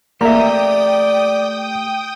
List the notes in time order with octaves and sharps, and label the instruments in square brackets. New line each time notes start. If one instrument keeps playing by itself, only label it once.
[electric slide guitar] A3 G4 [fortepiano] A#3 E5 [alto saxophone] D5 [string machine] G5 D#6